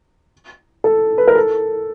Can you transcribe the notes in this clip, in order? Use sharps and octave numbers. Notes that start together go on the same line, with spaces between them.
A4
B4
A#4
A4